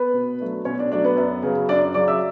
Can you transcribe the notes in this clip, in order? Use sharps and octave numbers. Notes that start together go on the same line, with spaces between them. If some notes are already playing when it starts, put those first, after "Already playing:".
Already playing: B3 B4
B2
F#3 A3 D4
B2 C#4 C#5
D4 D5
F#3 A3 D4 D5
B3 B4
F#2
C#3 F#3
F#2 D4 D5
C#3 F#3 D5 D6
E5 E6